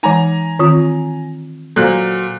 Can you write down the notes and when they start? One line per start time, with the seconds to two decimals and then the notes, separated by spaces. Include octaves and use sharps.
0.03 E3 G#3 D#4 G#5 A#5
0.59 D#3 C4 F4
1.76 A#2 F#3 A4 C5 F5 F#6